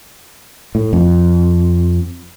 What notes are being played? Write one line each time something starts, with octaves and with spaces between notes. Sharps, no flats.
A2
F2